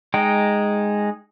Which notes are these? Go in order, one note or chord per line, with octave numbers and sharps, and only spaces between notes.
G#3 D#4 G5